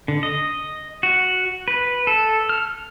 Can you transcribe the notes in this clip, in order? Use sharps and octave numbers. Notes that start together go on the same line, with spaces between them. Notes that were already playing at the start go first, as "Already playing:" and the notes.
D3
D#5
F#4
B4
A4
F6